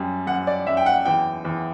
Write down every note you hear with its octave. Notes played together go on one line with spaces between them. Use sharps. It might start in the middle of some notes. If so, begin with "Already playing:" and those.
Already playing: F#2 G3
F#2 F#5
D5
F#2 E5
G5
F#5
E2 G5
E2